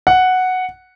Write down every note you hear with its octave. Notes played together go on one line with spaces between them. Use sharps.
F#5